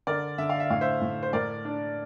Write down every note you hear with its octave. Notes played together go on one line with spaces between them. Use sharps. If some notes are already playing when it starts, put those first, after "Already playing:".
D3 A#4 D5
D3 E5
F5
E5
A2 F5
C5 E5
A2
C5
A2 A#4 D5
D4